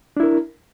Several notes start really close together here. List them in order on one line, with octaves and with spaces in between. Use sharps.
D4 E4 A#4